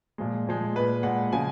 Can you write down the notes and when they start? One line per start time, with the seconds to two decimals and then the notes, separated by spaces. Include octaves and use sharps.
0.18 A#2 F3 G#3
0.47 A#2 F3 G#3
0.76 A#2 G#3 B4
1.03 A#2 G#3 F#5
1.33 C#3 F3 G#3 G#5